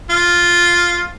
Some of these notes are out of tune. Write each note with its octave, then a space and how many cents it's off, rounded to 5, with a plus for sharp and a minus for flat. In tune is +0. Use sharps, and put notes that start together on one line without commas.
F4 +0